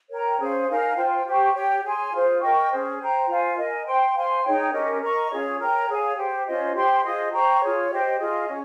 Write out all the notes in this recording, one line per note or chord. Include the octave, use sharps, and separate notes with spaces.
A#4 C#5 G5 A#5
C#4 G#4 C5 F5
D#4 A#4 F5 G#5
F4 C5 G5
G4 C5 G5 C#6
G4 C#5 G5
G#4 C#5 G#5 C6
F4 G#4 C5
A#4 D#5 G5 C#6
C#4 G#4 C5
C5 G5 A#5
F4 C5 F5 G#5
A#4 D#5 G#5
C5 G5 C6
C5 F5 G#5 C6
D#4 G#4 C#5 G5
C#4 G4 A#4 D#5
A#4 D#5 A#5 C#6
C#4 F4 G#4 C#5
A#4 C#5 G5 A#5
G#4 C#5 F5 G#5
G4 C5 G5
C#4 F4 C5 D#5
G4 C5 G5 C6
F4 G#4 C5 D#5
C5 G5 A#5 C#6
F4 G#4 C#5
G4 C5 D#5 G5
F4 G#4 D#5
C#4